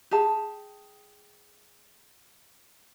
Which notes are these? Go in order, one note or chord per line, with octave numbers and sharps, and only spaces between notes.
G4 G#4 A5